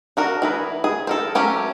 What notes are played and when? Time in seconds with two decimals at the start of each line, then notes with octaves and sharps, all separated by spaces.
0.17 D4 F#4 A#4
0.42 E3 G#4 B4
0.84 G#4
1.07 A4 A#4 C5
1.35 F#3 A3 C#4 G4